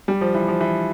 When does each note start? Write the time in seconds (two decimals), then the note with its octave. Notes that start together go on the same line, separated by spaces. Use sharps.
0.08 G3
0.21 F3
0.34 E3
0.48 F3
0.61 E3